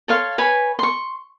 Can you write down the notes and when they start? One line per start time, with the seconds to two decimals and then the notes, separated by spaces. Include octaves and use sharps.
0.08 A4 C#5 F5 C6
0.38 B4 C#5 G#5 B5
0.79 C6 C#6